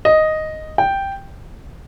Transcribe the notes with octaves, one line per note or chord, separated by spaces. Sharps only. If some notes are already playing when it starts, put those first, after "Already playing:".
D#5
G5